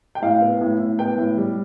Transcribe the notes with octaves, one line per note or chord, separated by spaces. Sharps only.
G5
A2 F5
B3
A2
A2
B3 G5
A2
G3